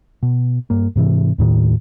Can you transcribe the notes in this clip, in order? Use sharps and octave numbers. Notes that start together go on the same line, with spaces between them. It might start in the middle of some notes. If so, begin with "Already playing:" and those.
B2
G2 A#3
G#2 C3 E3
D#2 A2 D#3